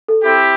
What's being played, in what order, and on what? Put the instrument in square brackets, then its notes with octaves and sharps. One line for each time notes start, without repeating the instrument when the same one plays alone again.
[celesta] A4
[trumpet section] C4 E4 G4